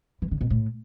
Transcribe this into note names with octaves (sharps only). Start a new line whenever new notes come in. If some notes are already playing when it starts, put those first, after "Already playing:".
E3
D3
B2
A2